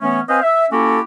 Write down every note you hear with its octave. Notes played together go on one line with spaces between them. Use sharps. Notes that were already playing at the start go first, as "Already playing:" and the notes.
E3 A3 B3 C#4
C4 B4 C5 D#5 F5 G#5
E5
A#3 C#4 E4 F#4 G4 A4